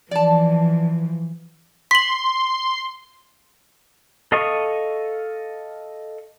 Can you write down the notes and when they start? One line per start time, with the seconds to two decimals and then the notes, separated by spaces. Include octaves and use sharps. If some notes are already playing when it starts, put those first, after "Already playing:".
0.11 E3 F3 D5 A5
1.91 C6 B6 F#7
4.32 A4 D#5 F5 C#6 D#6